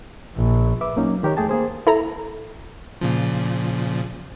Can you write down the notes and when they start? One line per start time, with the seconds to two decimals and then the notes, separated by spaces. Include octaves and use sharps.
0.35 A#1
0.81 B4 E5 D6
0.96 F#3 A#3 C#4 D#4
1.23 D#3 G4 A#4 C#5
1.37 F2 A3 G#4 G5 A5
1.49 A#3 G#4 C5
1.87 E4 A4 A#5
3.01 A#2 C#3 F3